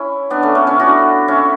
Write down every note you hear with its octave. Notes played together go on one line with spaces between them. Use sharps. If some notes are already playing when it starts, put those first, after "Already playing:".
Already playing: C#4 E4
B3 D4
A3 C#4
A3 C#4
C#4 E4
D4 F#4
C#4 E4